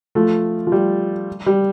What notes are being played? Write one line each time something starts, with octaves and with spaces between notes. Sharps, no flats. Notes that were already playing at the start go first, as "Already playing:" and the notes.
F3 A3
F3
G3
G3